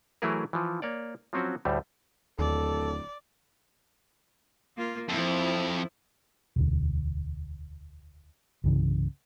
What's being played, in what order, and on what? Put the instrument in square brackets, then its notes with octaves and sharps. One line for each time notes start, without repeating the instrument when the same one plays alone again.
[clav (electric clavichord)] E3 F#3 A3 E4 G#4 A#4
E3 F3
A#3 C#5 D5
F3 F#3 C4 C#4 F#4
D2 A2 G3 A3
[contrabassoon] D1 [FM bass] D#2 [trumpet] A4 [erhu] D5
[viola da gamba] A#3 F4
[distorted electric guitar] F2 [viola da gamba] F3 E4
[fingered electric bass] E1 D2
C2 G2 C#3 E3